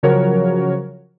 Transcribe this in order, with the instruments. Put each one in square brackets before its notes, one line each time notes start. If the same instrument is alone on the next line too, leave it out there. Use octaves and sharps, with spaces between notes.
[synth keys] C#3 F3 F#3 F#4 A#4 C#5